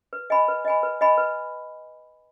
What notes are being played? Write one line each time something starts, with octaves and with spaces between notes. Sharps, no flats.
B4
D#5 G#5 B5
B4
D#5 G#5 B5
B4
D#5 G#5 B5
B4